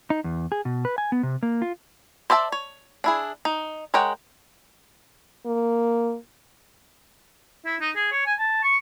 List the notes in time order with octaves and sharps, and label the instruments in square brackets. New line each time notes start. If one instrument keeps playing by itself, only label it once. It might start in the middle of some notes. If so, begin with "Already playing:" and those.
[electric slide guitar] D#4
E2
G#4
B2
B4
G#5
B3
C3
A#3
F4
[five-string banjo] C5 D5 E5 G#5 A5
C#5
D4 E4 G#4
D#4
G#3 A#4 C#5 F#5 G5
[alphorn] A#3
[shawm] E4
D#4
G#4
C#5
G#5
A5
C#6